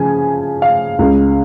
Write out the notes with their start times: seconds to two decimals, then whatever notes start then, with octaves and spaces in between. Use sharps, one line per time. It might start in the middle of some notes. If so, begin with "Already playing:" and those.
Already playing: C#3 F3 G#5
0.62 F5
0.99 C#2 C#3 G#3